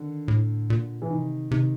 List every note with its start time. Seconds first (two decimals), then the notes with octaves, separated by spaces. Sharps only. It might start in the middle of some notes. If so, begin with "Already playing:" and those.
Already playing: D3 D#3
0.28 A2
0.70 A#2
1.02 E3
1.10 C3 D#3
1.51 C3 D#3